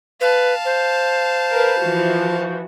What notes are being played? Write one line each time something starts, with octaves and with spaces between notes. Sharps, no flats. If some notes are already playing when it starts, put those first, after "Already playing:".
B4 F5 A5
C5
A#4 B4
E3 F3 F#4